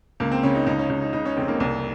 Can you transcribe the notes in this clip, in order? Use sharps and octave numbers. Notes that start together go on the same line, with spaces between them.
C#2 A#3
C4
C#3 C#4
D#4
C#2 D#4
C#4
C#2 D#4
D#4
C#3 D#4
C#4
F1 C4
A#3
C2